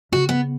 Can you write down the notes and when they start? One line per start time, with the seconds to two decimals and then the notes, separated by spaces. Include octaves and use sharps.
0.12 C#3 F#4
0.29 B3